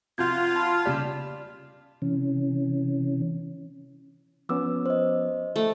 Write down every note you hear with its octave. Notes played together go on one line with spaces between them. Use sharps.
C3 F3 F4 F#4 G6 G#6
A5 B5 F6
C#3 G3 G4 D5
C3 E3 C#4
F3 B3 C#4 D6 E6
C5 D#5
A3